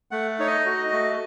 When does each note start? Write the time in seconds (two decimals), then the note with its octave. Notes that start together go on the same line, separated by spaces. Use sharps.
0.11 A3 F#5
0.39 D#4 C#5
0.47 D#5
0.66 F#4
0.92 A3